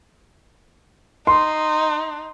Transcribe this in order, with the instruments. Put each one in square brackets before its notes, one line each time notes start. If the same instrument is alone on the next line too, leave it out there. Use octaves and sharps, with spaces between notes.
[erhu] D#4 [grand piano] C6